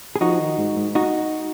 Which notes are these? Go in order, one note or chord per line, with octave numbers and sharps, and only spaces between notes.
G#4
F3 D#4 F#4
D#3
G#2
G#2
D#4 F#4